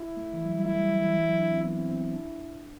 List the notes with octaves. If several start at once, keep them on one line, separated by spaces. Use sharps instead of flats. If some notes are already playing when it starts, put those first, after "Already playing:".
Already playing: E4
A3
E3
F#3
G3
A3 E4
G3
F#3
E3
E3
F#3
D4
C4
B3 E4
C4
C4
C4
D4